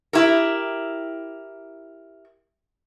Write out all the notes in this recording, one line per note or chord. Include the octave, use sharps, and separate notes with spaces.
E4 G4 A#4